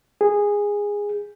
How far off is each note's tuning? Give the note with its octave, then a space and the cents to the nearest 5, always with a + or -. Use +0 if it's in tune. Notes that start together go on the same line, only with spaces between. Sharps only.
G#4 -15